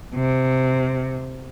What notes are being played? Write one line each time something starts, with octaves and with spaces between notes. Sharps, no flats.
C3